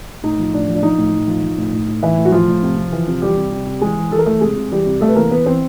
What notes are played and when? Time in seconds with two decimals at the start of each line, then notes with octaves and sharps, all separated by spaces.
0.23 A2 D#4
0.39 F3
0.53 A2 D4
0.68 F3
0.75 D4
0.83 F3 D#4
0.98 A2
1.13 A2
1.28 F3
1.43 F3
1.58 A2
1.72 A2
1.88 A2
2.03 A2 E3 E4
2.17 A2
2.25 F#4
2.32 A2 F3 F4
2.48 A2
2.63 C3
2.77 C3
2.92 E3
3.08 C3
3.22 E3 G3 G4
3.37 C3
3.52 C3
3.66 C3
3.81 E3 G#3 G#4
3.97 E3
4.11 E3 A4
4.19 A#4
4.26 E3 A3 A4
4.41 C3 G#3 G#4
4.56 C3
4.72 E3 G3 G4
4.86 C3
5.01 C3 A3 A4
5.09 B4
5.15 E3 A#3 A#4
5.31 E3 B3 B4
5.46 E3 C4 C5